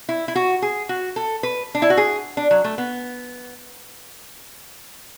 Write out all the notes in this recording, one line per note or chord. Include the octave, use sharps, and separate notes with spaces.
E4
E4
F#4
G#4
F#4
A4
B4
D4
E4
F#4
G#4
D4
F#3
A3
B3